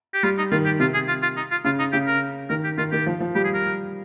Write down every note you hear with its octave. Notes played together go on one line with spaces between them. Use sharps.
G4
G3 F4
D#4
D#3 F4
G4
C3 F4
G#4
F4
F4
D#4
F4
C#3 F4
D#4
C#3 G4
A#4
D#3 A#4
G4
D#3 F4
D#3 G4
F3
F3
G3 G4
G#4
A#4